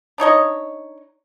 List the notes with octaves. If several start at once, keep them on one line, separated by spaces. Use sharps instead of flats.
D4 D#4 C#5 D#5